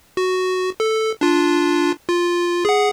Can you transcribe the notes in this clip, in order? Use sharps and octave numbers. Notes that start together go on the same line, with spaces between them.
F#4
A4
D4 F4
F4
G#4 F#5